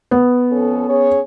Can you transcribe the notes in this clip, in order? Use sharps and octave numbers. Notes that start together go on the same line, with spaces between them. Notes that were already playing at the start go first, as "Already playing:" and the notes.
B3
F2 C#4 A4
C#4 G#4 C#5